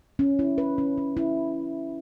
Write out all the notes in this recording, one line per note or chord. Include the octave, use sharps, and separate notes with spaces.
C#4
E4
B4
C#4
C#4
E4